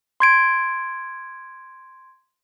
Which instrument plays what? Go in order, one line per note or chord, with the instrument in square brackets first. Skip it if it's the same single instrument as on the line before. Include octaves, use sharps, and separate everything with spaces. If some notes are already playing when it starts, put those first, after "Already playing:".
[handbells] C6 G#6 D7